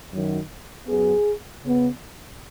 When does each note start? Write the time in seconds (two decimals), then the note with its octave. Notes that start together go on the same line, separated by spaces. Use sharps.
0.12 F#2 D#3 F#3
0.87 F#2 F#3 B3 G#4
1.62 C#3 B3